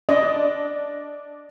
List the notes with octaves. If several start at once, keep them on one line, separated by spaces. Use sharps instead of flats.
D4 D#5